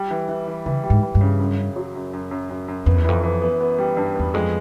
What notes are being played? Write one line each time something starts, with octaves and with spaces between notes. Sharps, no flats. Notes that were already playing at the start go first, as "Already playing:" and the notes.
Already playing: G3
E3
E3
E3
C#3 E3
G3
G#2
E3
G2
C#3
F#2
C#3
F#3
F#2
F#2
F#2
F#2
F#2
F2 B3
E2
F2 E3
E3
B3
B3
G3
G2
E2 B3
F2 G#3